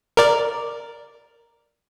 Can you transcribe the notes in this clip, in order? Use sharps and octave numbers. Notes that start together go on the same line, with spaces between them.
A#4 D5